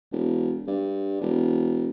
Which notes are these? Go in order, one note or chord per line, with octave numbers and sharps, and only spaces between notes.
E1
G2
E1